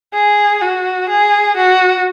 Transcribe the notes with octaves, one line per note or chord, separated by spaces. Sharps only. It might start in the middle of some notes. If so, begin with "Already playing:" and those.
G#4
F#4
G#4
F#4